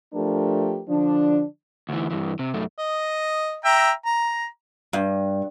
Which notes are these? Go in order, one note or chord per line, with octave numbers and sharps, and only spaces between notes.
F3 A3 D4 G4 A#4
D3 F3 D4
D2 E3
G2 E3
C3
F#2 A3
D#5
E5 G5 A#5
A#5
G2